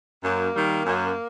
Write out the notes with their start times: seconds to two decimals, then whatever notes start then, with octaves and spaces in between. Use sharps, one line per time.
0.22 F#2 A#3
0.54 D#3 G3
0.86 F#2